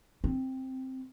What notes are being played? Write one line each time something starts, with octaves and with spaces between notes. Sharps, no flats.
C4